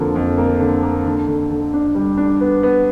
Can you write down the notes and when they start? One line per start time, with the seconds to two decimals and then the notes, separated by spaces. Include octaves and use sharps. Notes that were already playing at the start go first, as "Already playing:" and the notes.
Already playing: F2 D3 F3 A#3
0.15 F2
0.38 A#3
0.60 D3
0.83 A#3
1.05 D3
1.27 D3
1.51 D3
1.73 D4
1.95 G3
2.17 D4
2.41 B3
2.63 B3